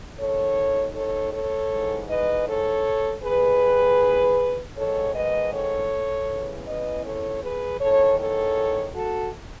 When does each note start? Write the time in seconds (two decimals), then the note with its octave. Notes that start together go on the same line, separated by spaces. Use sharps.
0.18 D#2 D#3 A4 C#5
0.95 A4 C#5
1.33 A4 C#5
1.71 G#2 E3
2.09 B4 D#5
2.47 A4 C#5
3.23 D#2 D#3 G#4 B4
4.77 G#2 D#3 A4 C#5
5.14 B4 D#5
5.52 A4 C#5
6.28 E2 C#3 E3
6.67 B4 D#5
7.05 A4 C#5
7.42 G#4 B4
7.80 E2 D#3 A4 C#5
8.19 A4 C#5
8.95 F#4 A4